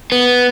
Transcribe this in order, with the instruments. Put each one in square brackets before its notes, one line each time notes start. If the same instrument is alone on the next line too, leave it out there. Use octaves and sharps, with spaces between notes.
[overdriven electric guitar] B3